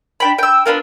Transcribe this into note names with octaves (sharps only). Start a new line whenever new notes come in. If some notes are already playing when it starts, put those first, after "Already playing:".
D4 G5 B5
G5 E6
B3 D4 F4 A#4